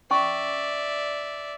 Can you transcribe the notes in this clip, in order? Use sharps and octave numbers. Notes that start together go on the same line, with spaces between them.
C#4 D5 E5 C#6